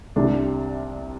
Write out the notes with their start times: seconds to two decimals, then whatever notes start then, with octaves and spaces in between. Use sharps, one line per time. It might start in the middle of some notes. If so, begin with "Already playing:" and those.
0.16 C2 C3 G3 D4 G4